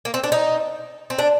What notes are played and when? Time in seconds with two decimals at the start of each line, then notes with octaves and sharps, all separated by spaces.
0.05 A#3
0.14 C4
0.24 D4
0.32 D#4
1.10 C4
1.19 D4